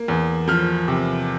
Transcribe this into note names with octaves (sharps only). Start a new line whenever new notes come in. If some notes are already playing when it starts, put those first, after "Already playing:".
Already playing: A#3
E2
F3 F6
C3